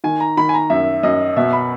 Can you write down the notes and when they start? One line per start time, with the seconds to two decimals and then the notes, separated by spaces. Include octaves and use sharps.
0.04 D#3 G#5
0.20 A#5
0.37 D#3 B5
0.49 G#5
0.54 A#5
0.70 F#2 E5
1.03 F#2 D#5
1.37 B2 E5
1.53 B5